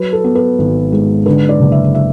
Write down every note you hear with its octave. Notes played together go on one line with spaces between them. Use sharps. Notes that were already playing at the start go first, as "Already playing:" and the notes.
Already playing: F#3 B4
A4
B3
B4
G#1
G#2
D3 B4
D5
F#1
E5
E5